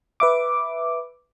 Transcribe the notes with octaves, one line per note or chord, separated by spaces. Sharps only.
B4 E5 D6